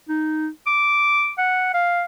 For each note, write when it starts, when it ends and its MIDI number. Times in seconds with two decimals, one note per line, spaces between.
0.09 0.48 63
0.67 1.31 86
1.38 1.71 78
1.74 2.03 77